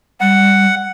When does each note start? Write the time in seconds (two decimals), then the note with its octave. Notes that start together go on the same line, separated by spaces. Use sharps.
0.21 G3 F#5